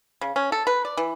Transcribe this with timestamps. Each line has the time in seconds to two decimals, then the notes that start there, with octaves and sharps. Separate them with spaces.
0.21 C#3
0.36 C#4
0.52 A4
0.67 B4
0.85 D5
0.97 E3